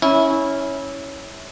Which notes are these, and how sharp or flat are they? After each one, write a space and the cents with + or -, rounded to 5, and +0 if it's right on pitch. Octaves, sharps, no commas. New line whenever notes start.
C#4 +0 E4 -20